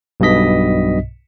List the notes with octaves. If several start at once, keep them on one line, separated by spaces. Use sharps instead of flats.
B1 G2 B2 D#5 B6